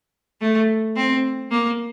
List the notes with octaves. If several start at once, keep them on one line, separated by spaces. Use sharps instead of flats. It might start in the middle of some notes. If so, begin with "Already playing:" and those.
A3
C4
A#3